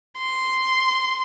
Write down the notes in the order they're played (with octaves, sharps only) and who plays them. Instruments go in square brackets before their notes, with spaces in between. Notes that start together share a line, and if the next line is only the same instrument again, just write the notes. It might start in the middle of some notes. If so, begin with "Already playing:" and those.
[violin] C6